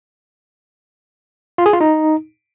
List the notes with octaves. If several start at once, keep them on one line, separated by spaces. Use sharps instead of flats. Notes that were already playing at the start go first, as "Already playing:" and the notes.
F4
G#4
F4
D#4